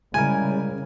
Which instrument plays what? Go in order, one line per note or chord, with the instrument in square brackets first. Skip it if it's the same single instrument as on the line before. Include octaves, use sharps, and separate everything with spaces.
[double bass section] C#3 [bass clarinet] G3 [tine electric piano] G#3 E4 A#4 [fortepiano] G#5